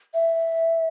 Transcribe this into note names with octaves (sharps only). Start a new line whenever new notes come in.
E5